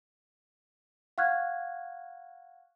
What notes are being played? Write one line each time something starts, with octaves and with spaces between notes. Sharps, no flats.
F5 F#5 C#6 F6 F#6 G#6